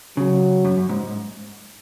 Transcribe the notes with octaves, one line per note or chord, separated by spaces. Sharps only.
C#3 F#3
F#2
F#2
G#2